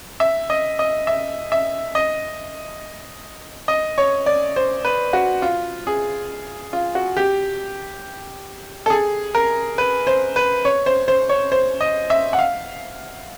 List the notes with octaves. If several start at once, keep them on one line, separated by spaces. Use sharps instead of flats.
E5
D#5
D#5
E5
E5
D#5
D#5
C#5
D5
C5
B4
F#4
F4
G#4
F4
F#4
G4
A4
G#4
A#4
B4
C5
B4
C#5
C5
C5
C#5
C5
D#5
E5
F#5
F5